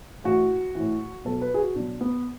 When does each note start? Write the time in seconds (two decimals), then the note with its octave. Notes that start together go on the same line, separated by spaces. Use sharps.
0.24 A2 E3 F#4
0.75 A2 E3
1.25 B2 F#3 A4
1.41 B4
1.54 G#4
1.59 F#4
1.75 B2 F#3 D4
2.01 B3